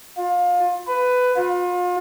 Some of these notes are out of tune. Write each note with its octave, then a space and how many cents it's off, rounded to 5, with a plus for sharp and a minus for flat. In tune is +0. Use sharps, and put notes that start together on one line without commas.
F4 +25
B4 +15
F4 +35